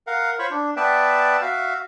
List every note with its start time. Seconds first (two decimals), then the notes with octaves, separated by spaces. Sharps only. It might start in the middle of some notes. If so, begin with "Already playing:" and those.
0.07 A#4 F5 F#5
0.39 F4 C5 C#5 B5 C#6
0.51 D4
0.77 B3 B4 D5 E5 G5 A5
1.41 F#4 E5 F5